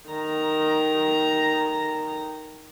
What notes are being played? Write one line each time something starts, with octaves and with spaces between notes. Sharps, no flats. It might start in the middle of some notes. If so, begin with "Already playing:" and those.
D#3 A#5